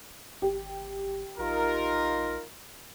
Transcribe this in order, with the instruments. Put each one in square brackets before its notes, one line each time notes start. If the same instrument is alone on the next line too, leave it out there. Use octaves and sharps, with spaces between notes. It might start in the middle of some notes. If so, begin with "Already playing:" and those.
[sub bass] G#1 [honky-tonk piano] G4
[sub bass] A#1 [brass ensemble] D#4 F4 A#4